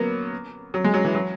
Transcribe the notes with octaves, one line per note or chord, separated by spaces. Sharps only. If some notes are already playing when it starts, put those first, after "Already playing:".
Already playing: F#3 A#3 B3
F#3
G#3
F#3
E3
F#3